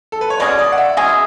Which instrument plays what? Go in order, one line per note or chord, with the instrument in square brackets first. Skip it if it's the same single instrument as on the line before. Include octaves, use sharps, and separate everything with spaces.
[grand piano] A4
B4
C#5
[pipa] B2 G#3 C#4 G#4 [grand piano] D5
[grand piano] D5
F#5
E5
[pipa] B2 G#3 C#4 G#4 [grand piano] E5